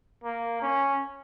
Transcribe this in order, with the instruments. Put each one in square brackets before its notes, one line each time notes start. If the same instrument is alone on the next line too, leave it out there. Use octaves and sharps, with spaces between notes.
[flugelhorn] A#3
C#4